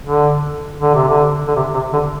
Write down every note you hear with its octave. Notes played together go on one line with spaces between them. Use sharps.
D3
D3
C3
D3
D3
C3
C3
D3